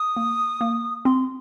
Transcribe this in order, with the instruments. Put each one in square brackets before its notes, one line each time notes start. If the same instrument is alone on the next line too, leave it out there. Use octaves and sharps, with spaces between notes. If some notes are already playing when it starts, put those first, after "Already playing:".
Already playing: [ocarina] D#6
[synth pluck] A#3
A#3
[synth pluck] C4 [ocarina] C6